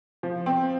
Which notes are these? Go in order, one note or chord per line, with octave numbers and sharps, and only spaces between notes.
F3
C4